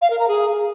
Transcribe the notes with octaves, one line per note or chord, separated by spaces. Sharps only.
F5
A#4
A#5
G#4